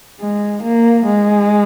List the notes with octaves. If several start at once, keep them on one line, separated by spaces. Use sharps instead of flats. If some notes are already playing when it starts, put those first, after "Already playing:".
G#3
A#3
G#3